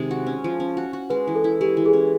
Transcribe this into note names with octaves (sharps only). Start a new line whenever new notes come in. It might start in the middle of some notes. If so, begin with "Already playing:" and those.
Already playing: C3 D#3 G#3
F#4
C#4
F3
C#4
F#4
F#4
G#3 B4
E3
A4
E4
G#3 G4
E3
G#4
C#4